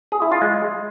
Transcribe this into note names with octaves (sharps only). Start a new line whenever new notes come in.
G#4
E4
F4
G#3